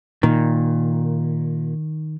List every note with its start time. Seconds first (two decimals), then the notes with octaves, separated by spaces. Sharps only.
0.23 A#2 D#3